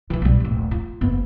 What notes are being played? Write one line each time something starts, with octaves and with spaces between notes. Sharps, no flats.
D#3 E3
B1 G3
D#1 A1
F4
F#1 B3